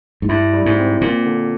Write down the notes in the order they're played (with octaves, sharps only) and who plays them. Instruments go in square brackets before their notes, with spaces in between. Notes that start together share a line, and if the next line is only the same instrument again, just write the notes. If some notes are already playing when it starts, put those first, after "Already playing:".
[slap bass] G#2
[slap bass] G2 [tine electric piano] E4
[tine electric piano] G3
[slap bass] G#2
[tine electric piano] C4
[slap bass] A#2 [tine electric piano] A#3
[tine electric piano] D3